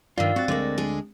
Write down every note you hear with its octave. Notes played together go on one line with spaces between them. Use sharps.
G2 D#3 F4 D5 F5 E6
C4 F#4 A6
D2 D3 G#3 A#3 D5
G#3 D4 G#4